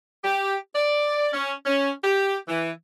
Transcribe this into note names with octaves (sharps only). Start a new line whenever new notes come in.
G4
D5
C#4
C#4
G4
E3